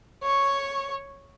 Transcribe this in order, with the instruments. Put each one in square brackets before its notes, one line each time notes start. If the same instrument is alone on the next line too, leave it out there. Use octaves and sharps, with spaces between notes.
[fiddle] C#5 C#6